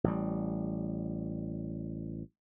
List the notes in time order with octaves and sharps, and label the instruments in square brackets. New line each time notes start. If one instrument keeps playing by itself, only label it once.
[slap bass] A1 G3